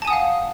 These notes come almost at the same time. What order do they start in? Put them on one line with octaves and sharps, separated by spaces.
A5 G#5 D#6 F#5 F5